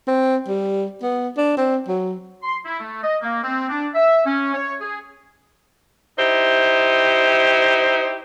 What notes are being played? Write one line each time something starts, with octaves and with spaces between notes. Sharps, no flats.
C4
G3
B3
D4
C4
F#3
C6
E4
A3
D#5
A#3
C4
D4
E5
C#4
C#5
G#4
D#4 E4 G4 C5